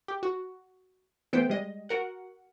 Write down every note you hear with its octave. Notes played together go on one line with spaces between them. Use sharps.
G4
F#4
E3 A3 B3 C5 G5
G3 G#3 D#5
F#4 A#4 F#5